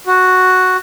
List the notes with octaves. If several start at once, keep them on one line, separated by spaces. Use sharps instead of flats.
F#4